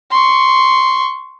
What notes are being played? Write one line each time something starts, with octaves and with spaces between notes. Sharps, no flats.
C6 C#6